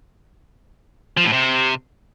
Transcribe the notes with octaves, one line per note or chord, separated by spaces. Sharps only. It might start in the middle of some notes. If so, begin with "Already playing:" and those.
F3
A2
C3